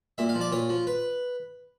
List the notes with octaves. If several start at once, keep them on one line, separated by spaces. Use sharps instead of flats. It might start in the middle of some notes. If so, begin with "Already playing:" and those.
A#2 E5
F5
F3
D5
A#2 C#5
F3
B4